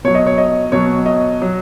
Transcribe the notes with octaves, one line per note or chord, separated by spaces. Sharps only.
B2 F#3 C#5
D#5
C#5
D#5
B2 F#3 C#5
D#5
F#3